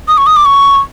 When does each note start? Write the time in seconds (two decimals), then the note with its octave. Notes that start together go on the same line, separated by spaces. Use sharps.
0.08 D#6
0.18 C#6
0.27 D#6
0.36 D6
0.45 C#6